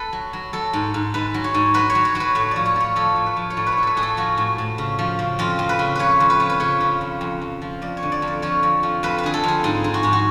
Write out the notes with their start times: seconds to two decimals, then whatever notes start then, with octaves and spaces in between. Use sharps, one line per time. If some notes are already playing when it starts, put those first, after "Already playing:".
Already playing: A4 B4
0.13 F#3
0.33 F#3
0.53 F#3 A4
0.73 G#2
0.94 G#2
1.14 G#2 B4
1.34 F#3
1.44 C#5
1.54 G#2
1.74 F#3 B4
1.90 C#5
1.95 F#3
2.05 C#5
2.15 F#3
2.20 B4
2.35 A2 C#5
2.51 F3 D5
2.65 C#5
2.76 F3 C#5
2.96 F3 A4
3.16 A2
3.26 B4
3.37 F3
3.50 C#5
3.57 A2 D5
3.66 B4
3.72 C#5
3.77 A2
3.83 A4 B4
3.97 A2 G#4
4.03 A4
4.17 F3 F#4
4.37 A2
4.58 A2
4.78 C#3
4.99 F3
5.19 C#3
5.39 F2 F4
5.59 F2
5.69 B4
5.79 C#3
5.95 F2 B4 C#5
6.20 F2
6.30 B4
6.40 F3 C#5
6.50 B4
6.60 C#3 C#5
6.80 C#3
7.01 F2
7.21 F2
7.41 F2
7.62 F3
7.82 F2 D5
7.97 C#5
8.03 D3
8.12 D5
8.22 F2
8.27 D5
8.42 F3 C#5
8.63 F2
8.83 F3
9.03 F2 B4
9.18 B4
9.23 D3 G#4
9.34 A4
9.44 F2 G#4
9.64 G#2 G#4
9.84 G#2
9.94 F#4
10.03 G#2 G#4
10.13 F#4